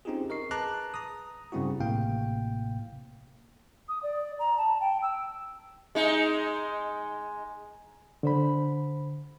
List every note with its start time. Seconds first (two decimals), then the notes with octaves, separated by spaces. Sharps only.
0.05 C4 C#4 D#4 F4 G4 G#4
0.30 A#4 D#5 C#6 C7
0.51 G#4 B4 A5 A#5 D6 F#6
0.94 A#5 D#6
1.52 G2 C#3 G3 C4 E4 F#4
1.80 A1 A2 C3 A#3 F5 G5
3.88 D#6
4.02 D5
4.39 A#5
4.57 A5
4.80 G5
5.02 E6
5.95 G#3 D#4
8.23 D3 C5 B5